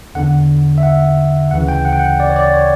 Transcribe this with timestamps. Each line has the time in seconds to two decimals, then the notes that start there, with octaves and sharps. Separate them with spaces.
0.15 E2 D3 F#5
0.78 E5
0.83 F#5
1.51 D2 C#3 E3 F#5
1.68 G5
1.85 F#5
1.93 G5
1.99 F#5
2.20 D5
2.30 C#5
2.36 D5
2.54 C#5